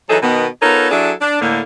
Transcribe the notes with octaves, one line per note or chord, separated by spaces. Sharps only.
E3 F#3 D#4 G#4 A4
B2 D#3 B3
B3 D#4 F4 A4 A#4 C#5
F#3 D4 E4 G#4 A4
D4
A2 D3 A#3